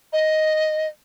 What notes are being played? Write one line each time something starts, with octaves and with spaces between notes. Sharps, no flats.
D#5